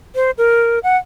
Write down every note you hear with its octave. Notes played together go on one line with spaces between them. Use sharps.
C5
A#4
F#5